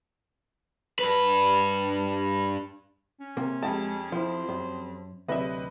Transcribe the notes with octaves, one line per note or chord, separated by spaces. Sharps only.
G2 B4
C#4
C3 A#3
F2 G#3 G4 A5
F3 E4 C5
F#2
D2 C3 F#3 B4 D#5 E5